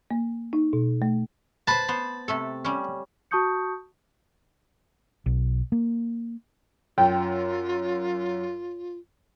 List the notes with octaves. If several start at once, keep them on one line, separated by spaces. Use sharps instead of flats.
A#3
D#4
B2
A3
B4 C5 A5 B5
B3 C5
C3 A3 A4
G3 C#4
F#4 A5 C#6 D#6 G6 C#7
B1
A#3
F#2 F4 G5